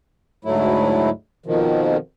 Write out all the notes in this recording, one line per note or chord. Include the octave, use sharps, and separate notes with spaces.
D2 G#2 F#3 A3 E4
F2 B2 D#3 F3